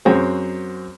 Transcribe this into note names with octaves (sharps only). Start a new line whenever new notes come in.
F#2 C4 F#4 G#4 C5